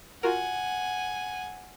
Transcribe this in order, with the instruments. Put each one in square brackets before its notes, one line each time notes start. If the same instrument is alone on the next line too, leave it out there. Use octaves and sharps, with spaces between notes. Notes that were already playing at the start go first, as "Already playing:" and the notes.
[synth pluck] F4 F#4 A#4 [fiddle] F#5 G#5